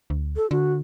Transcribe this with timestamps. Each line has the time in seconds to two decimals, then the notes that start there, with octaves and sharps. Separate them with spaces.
0.10 D2
0.36 A4
0.51 D3 F#4